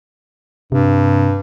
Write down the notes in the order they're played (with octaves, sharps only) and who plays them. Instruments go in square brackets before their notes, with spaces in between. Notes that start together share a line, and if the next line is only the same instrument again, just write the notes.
[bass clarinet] G2 [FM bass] C3